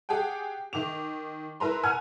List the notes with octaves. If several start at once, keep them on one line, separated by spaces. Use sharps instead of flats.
G4 G#4 F#5 G5
D#3 D6 F7
E4 A#4 B4 A#5 C6
F#5 G#5 F6 G#6